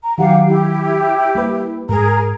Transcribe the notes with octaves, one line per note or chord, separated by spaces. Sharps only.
A#5
D#3 F#3 G4 F5 F#5
E4 G4
G3 A#3 B4
G#2 G#4 A#4 A#5